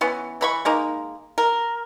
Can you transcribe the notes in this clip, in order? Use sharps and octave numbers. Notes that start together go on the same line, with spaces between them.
E3 B3 C#4
E3 B5 C#6
G#3 A#3 D#4
A#4